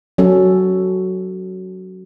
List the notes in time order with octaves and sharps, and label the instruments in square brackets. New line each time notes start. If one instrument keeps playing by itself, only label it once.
[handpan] F#3 C#4 A4